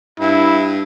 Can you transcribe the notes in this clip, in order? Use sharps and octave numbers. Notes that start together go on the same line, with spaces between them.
G2 E4